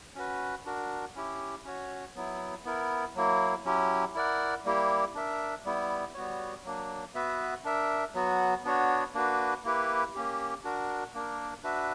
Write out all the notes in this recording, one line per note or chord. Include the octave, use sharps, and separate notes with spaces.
C#4 F#4 B4
D4 F#4 A#4
C#4 E4 G4
C#4 F#4 C#5
F#3 B3 E4
B3 E4 A#4
F#3 A#3 E4
F#3 C#4 E4 G4
E4 A#4 D5 F#5
G3 A#3 E4 G4
D4 A#4 E5
G3 B3 E4
G3 B3 F#4 C#5
F#3 A#3 D4
B3 F#4 B4 E5
D4 A#4 E5
F#3 B3 F#4
B3 D4 F#4 C#5
A#3 D4 F#4 B4
A#3 E4 G4 B4
A#3 C#4 G4
D4 F#4 A#4
A#3 D4 A#4
D4 F#4 B4 E5